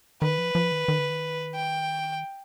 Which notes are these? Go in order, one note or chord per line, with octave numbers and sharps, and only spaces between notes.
D#3 B4
F3
F3
D#3
D#3
D3
D#3
G5